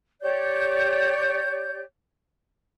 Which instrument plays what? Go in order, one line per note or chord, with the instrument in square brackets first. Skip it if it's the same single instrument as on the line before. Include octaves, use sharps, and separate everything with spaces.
[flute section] G4 C#5 D5 G6